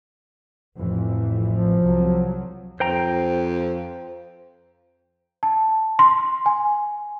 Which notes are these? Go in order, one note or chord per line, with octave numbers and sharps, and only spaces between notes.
A1 F2 E3
F3
C2 F#3
F2 C5 G5 A#5
A5
C6
G#5